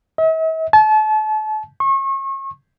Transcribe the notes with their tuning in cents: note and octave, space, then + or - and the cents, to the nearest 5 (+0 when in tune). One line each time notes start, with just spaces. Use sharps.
E5 -45
A5 -35
C#6 -35